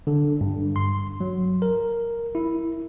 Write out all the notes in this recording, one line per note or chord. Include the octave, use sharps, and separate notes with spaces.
D3
G2
C6
F#3
A#4
E4